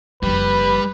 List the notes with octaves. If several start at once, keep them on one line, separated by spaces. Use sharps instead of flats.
F#1 F3 G3 B4